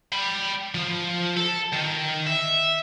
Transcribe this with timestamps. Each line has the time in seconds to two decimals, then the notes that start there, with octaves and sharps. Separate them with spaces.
0.12 G5 B5
0.75 F3
1.36 A4
1.72 D#3
2.27 E5